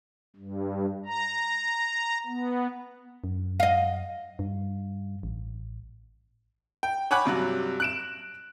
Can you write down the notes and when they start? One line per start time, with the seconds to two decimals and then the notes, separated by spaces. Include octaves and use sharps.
0.36 G2
1.06 A#5
2.27 B3
3.24 F#2
3.60 D#5 F5
4.39 G2
5.23 A1
6.83 G5
7.11 C#5 F#5 G#5 B5 D6 F#6
7.25 G2 C3 F#3
7.80 F#6 D7 E7